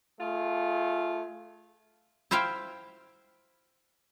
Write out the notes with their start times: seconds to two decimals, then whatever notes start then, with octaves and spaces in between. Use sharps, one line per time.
0.19 A3 F4 G#4
2.31 E4 C5 E5 F5 G5